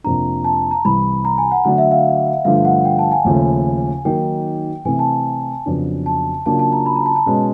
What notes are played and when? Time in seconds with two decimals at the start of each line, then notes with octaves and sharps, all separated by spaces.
0.04 F2 C3 F3 A#3 D4 A#5
0.44 A5
0.71 A#5
0.85 C2 C3 E3 G3 B5
1.25 A#5
1.38 G#5
1.52 F#5
1.65 D3 F#3 A3 D4 F#5
1.78 E5
1.91 F5
2.45 G2 D3 F3 A3 F5
2.65 F#5
2.85 G5
2.99 A5
3.12 G#5
3.25 D#2 C#3 F3 A3
4.05 D#3 F#3 A#3 D#4 G5
4.85 C3 E3 A3 C4 G#5
4.99 A5
5.66 F2 C#3 F#3 B3 D4
6.06 A5
6.46 C#3 F#3 A#3 D4 F4 A5
6.59 A5
6.73 A#5
6.86 B5
6.96 A#5
7.06 A5
7.16 A5
7.26 B2 G#3 C#4